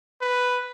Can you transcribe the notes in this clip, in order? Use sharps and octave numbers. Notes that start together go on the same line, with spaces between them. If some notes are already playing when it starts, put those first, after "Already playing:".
B4